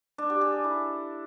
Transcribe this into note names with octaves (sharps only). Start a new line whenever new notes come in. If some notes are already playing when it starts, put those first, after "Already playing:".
D4
G4
G#4
A4
E4